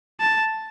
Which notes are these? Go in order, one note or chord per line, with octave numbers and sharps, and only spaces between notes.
A5